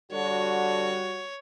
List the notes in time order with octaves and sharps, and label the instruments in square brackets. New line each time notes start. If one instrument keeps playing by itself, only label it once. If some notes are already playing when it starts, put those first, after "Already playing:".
[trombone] D3 [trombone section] G3 F#4 [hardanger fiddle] C#5